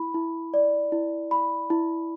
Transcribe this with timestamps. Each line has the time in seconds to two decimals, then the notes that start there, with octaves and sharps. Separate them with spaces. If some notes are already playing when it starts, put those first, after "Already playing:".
Already playing: E4 B5
0.14 E4
0.54 D5
0.92 E4
1.31 B5
1.70 E4